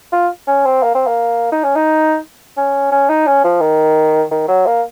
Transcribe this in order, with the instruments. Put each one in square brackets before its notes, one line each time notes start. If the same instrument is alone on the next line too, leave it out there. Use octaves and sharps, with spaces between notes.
[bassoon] F4
C#4
C4
A#3
C4
A#3
D#4
C#4
D#4
C#4
C#4
D#4
C#4
F3
D#3
D#3
F#3
A#3